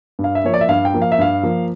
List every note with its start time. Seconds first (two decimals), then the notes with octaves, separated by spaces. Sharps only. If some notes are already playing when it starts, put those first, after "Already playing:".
0.19 G2
0.24 F5
0.35 E5
0.44 F3 A#3 C#5
0.54 D5
0.61 E5
0.69 G2 F5
0.85 G5
0.94 F3 A#3
1.02 F5
1.12 E5
1.19 G2 F5
1.43 F3 A#3